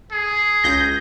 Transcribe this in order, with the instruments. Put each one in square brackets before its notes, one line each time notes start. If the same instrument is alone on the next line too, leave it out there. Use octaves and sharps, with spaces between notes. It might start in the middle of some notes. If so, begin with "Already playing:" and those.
[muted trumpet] G#4
[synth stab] C#2 G6 A#6